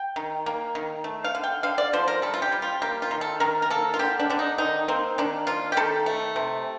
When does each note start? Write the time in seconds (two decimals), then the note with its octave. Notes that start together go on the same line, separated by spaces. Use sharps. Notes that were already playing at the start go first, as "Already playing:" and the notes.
Already playing: G5
0.16 D#3
0.46 A#3
0.75 D#3
1.04 A3
1.24 F5
1.35 D3
1.44 G5
1.63 D3 F5
1.78 D5
1.93 F3 C5
2.08 A#4
2.22 G3 A4
2.34 F4
2.42 G4
2.52 G3
2.62 F4
2.82 A#3 G4
3.02 F4
3.11 D#3
3.21 A4
3.40 D#3 A#4
3.62 A#4
3.70 A#3 A4
3.94 F4
3.99 D3 G4
4.20 D4
4.30 D3 D4
4.39 D#4
4.58 D#3 D#4
4.88 A#3 C4
5.18 D#3 D4
5.47 A#3 F4
5.72 G4
5.77 D#3 A4
6.06 A3
6.36 C3